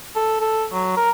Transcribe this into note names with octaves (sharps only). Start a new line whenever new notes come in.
A4
A4
F#3
A#4